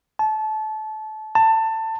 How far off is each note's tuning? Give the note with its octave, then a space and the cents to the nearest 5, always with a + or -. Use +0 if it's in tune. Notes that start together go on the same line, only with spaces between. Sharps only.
A5 -25
A5 +20